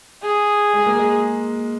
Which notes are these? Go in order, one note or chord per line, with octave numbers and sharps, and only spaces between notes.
G#4
G#3
A#3
G#3